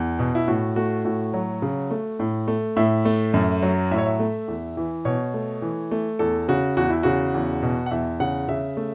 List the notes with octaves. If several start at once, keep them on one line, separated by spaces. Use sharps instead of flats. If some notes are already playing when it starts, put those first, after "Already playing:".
Already playing: E2
B2
E4
A2 F#4
A3 F#4
A2 F#4
F#3
C#3
A3
A2
A3
A2 E5
A3
F#2
F#3
A2 E5
C#5
E5
A3
E2
E3
B2 C#5
A3
E3
A3
E2 A4
C#3 F#4
E2 F#4
E4
C#3 F#4
E2
B2
F#5
E2 E5
C#3 F#5
C#3 E5
A3